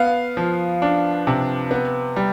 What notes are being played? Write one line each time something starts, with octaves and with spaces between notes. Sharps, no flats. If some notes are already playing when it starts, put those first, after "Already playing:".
Already playing: B3 F5
F3
D4
C3
B3
G3